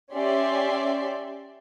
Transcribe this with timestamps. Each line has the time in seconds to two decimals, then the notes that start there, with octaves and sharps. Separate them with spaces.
0.12 C#4 G4 D5 E5 C6